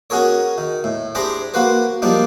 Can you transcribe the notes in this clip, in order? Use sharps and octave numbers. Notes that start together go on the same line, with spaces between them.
C#4 F#4 G#4 A#4 C#5
D#3
A2
D4 G4 G#4 C5 A#5 B5
A#3 F#4 B4 C5
F3 G3 A#3 D4 D#4